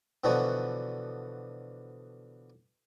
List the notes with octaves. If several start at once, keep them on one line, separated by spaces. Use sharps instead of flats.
B2 D3 E3 F3 B3 F#4